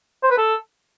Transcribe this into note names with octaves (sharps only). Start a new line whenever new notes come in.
C5
B4
A4